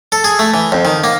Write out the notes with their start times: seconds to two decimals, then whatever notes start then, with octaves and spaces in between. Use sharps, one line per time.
0.12 A4
0.24 G#4
0.39 A3
0.54 E3
0.72 F2
0.85 D#3
1.04 A#3